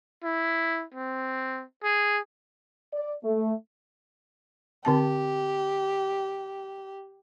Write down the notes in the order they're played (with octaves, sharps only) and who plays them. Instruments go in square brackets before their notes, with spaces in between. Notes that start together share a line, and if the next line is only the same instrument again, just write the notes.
[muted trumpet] E4
C4
G#4
[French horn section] D5
A3
[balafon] D3 C4 A5 [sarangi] G4